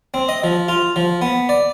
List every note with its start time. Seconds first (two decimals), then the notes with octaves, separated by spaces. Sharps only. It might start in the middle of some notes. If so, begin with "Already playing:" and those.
0.14 C4
0.29 D#5
0.44 F3
0.68 F4
0.96 F3
1.21 B3
1.49 D5